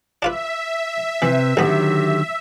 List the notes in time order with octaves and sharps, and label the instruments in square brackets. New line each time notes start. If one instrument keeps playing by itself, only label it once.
[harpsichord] D4 F4 B4 [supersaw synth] E5
[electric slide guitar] C3 [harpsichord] E3 [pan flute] B4
[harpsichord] A1 B3 [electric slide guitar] D3 D#3 F#3 [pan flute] G4